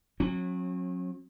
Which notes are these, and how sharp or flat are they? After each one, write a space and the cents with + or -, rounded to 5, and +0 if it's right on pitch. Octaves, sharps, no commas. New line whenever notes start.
F#3 -30 C#4 -45